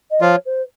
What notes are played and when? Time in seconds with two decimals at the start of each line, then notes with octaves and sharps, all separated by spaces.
0.11 D#5
0.21 F3 F4 C#5
0.46 C5